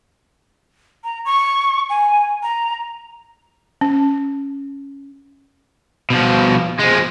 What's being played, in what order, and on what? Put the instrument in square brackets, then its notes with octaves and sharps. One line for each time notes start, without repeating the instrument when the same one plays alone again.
[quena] A#5
C#6
G#5
A#5
[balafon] C#4
[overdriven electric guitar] B2 F3
F3 G#3